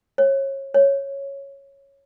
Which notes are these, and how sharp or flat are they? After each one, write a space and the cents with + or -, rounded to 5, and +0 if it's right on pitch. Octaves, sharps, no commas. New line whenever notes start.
C#5 -25
C#5 -5